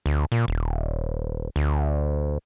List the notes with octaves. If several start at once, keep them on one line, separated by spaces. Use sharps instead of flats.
D2
A#2
D#1
D2